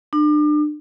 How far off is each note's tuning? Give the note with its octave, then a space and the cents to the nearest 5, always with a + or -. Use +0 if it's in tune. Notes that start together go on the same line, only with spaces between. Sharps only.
D4 +35